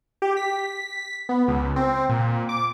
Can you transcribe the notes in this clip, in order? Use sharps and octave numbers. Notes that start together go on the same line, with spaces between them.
G4
B6
B3
C#2
C4
A#2
D6